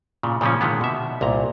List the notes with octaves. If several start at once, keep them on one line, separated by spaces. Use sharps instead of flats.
A#2 C#3
A#2 C#3 F3 A#3 C#4
A#2 D3 D#3 G#3 B3
B2 E5
C2 A#2 A#5